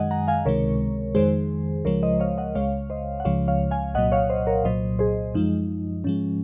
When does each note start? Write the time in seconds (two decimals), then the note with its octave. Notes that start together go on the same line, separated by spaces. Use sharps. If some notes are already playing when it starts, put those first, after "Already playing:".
Already playing: F#2 D#3 G#3 D#5 F#5 G#5
0.11 F#5 A#5
0.28 F5 G#5
0.45 C#2 C3 D#3 G#3 A#4 C#5
1.15 F2 D#3 G#3 G#4 C5
1.85 C#2 C#3 F3 G#3 A#4 C#5
2.03 C5 D#5
2.20 C#5 F5
2.38 D#5 F#5
2.55 C#2 C#3 G#3 C#5 F5
2.90 C5 D#5
3.20 F#5
3.25 C#2 C#3 F3 G#3 C#5 F5
3.48 C#5 F5
3.71 F5 G#5
3.94 C2 A#2 F#3 D#5 F#5
4.12 C#5 F5
4.30 C5 D#5
4.47 A#4 C#5
4.64 C2 A#2 F#3 C5 D#5
4.99 G#4 C5
5.34 F#2 F3 G#3 D#4
6.04 G#2 F3 G#3 C#4